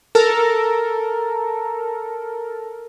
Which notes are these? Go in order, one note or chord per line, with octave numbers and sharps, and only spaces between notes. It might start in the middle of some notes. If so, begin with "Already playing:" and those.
A4 A#4